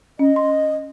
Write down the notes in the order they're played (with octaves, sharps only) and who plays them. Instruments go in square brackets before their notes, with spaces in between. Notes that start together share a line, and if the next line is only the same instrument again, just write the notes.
[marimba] C#4 [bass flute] D#5
[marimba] C6